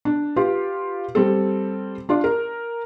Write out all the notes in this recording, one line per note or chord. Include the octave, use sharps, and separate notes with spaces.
D4
F4 G4 B4
G3 C4 A4
D4 F4 D5
A#4